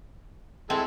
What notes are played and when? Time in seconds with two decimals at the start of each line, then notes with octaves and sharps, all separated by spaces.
0.70 G#3 C4 E4 A4